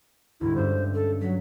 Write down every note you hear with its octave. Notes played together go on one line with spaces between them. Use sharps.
D2 G#2 G3 E4
G2 C#4 C5 E5
A4
F#3 B6